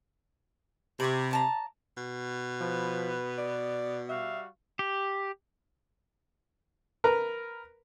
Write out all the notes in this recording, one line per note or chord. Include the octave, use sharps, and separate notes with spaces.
C3 B5 C#6
D5 A5 A#5
B2
F3 B4
D5
G3 F#4 E5 F5
G4
A#4 B4 A#5